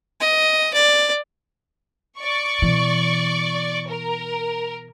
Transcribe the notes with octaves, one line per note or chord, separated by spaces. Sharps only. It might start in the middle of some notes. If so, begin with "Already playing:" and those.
D#5
D5
D5 C#6
B2 E3
A#4